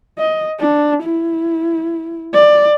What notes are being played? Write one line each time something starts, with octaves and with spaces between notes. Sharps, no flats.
D#5
D4
E4
D5